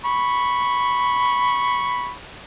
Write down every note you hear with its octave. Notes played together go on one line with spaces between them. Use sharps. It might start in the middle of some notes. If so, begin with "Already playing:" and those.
B5 C#6